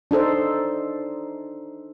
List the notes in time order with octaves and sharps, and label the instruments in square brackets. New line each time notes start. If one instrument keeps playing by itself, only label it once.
[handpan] D4 D#4 A4 C5